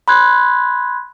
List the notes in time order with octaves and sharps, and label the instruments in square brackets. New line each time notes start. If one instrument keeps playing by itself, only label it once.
[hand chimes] B5 C6 F#6 G#6